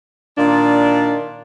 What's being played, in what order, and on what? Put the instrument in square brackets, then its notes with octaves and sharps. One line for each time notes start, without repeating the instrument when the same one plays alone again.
[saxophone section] A#2 D#3 D4 F5